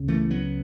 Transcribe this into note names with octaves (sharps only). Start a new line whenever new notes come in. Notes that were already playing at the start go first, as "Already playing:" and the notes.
Already playing: C#2 C#3
E3 A3
F#3 B3